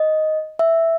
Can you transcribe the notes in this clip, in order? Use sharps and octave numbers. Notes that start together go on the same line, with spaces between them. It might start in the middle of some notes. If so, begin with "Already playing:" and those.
Already playing: D#5
E5